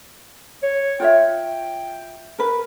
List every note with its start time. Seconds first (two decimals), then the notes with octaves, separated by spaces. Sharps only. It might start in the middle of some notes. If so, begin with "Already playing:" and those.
0.63 C#5
1.00 F4 C#5 E5 G5
2.39 A#4 B4